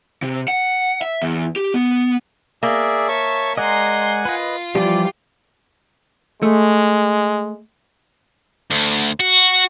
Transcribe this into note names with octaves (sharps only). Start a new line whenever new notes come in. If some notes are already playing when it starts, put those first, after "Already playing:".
C3
F#5
E5
E2
G4
B3
A#3 G#4 D5 E5
C#5 E5 A5 C#6
G#3 D5 D#5 F#5 G#5 A#5 C6
F4 B4 D#5
E3 F3 G3 G4 D5
G#3 A3
D2
F#4